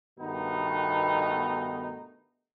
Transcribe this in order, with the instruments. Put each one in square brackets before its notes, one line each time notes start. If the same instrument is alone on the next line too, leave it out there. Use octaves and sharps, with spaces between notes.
[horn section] G2 B2 D#3 A3 B3 D#4